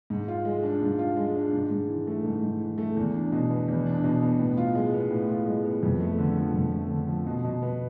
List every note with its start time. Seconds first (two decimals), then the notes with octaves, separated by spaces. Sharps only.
0.10 G#2
0.28 F4
0.45 G#3
0.63 D4
0.82 G#2
0.99 F4
1.17 G#3
1.35 D4
1.53 G#2
1.71 G#2
1.89 E3
2.07 A3
2.24 G#2
2.42 G#2
2.60 E3
2.78 A3
2.96 E2
3.14 D4
3.32 B2
3.51 B3
3.68 E2
3.86 D4
4.04 B2
4.22 B3
4.39 A2
4.57 F4
4.75 G#3
4.93 B3
5.11 A2
5.29 F4
5.46 G#3
5.65 B3
5.83 F2
6.00 A3
6.18 D3
6.36 F3
6.54 F2
6.72 A3
6.90 D3
7.08 F3
7.26 B2
7.44 B2
7.62 B3